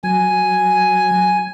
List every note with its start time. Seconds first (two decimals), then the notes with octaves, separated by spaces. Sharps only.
0.04 F#3 G#5